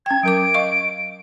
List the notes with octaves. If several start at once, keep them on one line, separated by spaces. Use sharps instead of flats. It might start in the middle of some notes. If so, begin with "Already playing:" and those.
C#4 G5 G#6
F#3 A#4 D6 D7
D#5 F5 C#6